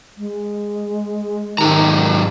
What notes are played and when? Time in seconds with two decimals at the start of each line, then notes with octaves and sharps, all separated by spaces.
0.18 G#3
1.58 G#2 D#3 G4 A#5